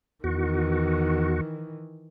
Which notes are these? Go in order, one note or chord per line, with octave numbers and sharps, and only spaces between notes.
E2 D#3 E3 F#4